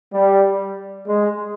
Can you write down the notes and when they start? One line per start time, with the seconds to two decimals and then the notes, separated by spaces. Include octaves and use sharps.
0.13 G3
1.08 G#3